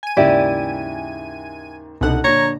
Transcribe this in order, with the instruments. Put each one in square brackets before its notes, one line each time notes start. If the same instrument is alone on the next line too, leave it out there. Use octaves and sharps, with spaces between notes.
[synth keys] G#5 D#7
[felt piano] D#2 G#2 C#3 [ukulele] E4 G4 D5
[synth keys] C2 B2 F#5 [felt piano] D4 D#4 A4
[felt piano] A#1 D3 [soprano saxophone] C#5 [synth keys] A#5